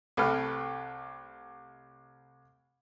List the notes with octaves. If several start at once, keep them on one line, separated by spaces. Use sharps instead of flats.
C2 A3 B4 G5 F6